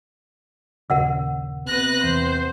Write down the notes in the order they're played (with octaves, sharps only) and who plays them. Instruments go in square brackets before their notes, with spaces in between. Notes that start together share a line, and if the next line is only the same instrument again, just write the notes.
[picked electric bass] A#1 D#2 C#3 [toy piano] A#4 F#5 E6
[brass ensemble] C3 B3 [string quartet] B4 F#6 A#6
[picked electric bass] E2 [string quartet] C5